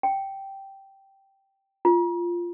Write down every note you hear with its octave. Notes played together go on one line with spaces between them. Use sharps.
G5
F4